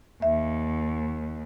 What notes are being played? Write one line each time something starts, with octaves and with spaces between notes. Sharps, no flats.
D#2 E5